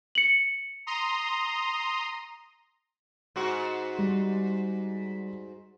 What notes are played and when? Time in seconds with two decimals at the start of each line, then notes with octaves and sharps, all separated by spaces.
0.15 C#7 F#7
0.87 A#5 C6 D#6
3.36 G#2 F#4
3.98 G3